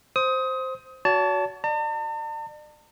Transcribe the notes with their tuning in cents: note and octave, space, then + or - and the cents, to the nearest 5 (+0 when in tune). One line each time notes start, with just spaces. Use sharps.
C5 +0 D#6 +25
F#4 +0 C#5 +45 A5 +0
D5 +40 A5 +45